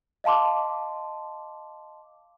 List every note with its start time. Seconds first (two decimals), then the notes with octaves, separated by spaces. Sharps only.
0.24 D#5 F5 A5 C6 D6